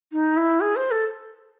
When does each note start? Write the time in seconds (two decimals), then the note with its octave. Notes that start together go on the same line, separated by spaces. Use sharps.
0.13 D#4
0.37 E4
0.61 G#4
0.76 C5
0.91 A4